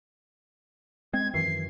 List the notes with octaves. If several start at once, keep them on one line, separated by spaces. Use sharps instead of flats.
G#3 C4 G#6
F#2 D#3 E3 C7